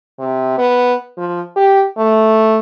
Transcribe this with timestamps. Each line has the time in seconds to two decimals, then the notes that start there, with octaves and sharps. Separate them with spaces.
0.19 C3
0.58 B3
1.18 F3
1.56 G4
1.97 A3